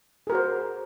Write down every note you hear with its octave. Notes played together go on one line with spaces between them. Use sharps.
F#4 G#4 A#4 C5